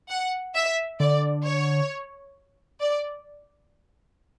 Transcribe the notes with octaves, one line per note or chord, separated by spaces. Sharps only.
F#5
E5
D3 D5
C#5
D5